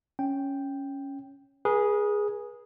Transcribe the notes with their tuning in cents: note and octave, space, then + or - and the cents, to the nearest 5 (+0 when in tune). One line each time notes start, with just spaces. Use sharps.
C#4 +0 G5 +0
G#4 -5 B4 -40